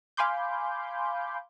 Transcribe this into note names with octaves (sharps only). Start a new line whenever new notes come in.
F5 G#5 B5 C6 D6 G6